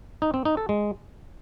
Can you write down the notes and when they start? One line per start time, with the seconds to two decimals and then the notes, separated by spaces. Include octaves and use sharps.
0.22 D#4
0.34 C4
0.45 D#4
0.57 A4
0.69 G#3